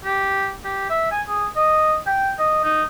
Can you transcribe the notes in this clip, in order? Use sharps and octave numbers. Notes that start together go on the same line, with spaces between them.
G4
G4
E5
G#5
G#4
D#5
G5
D#5
D#4